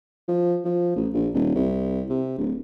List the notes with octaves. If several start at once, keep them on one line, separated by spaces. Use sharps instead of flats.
F3
F3
A1
A#1
D#1
C2
C3
D1